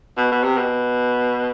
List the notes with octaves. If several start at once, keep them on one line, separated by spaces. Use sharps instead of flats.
B2
B2
C3
B2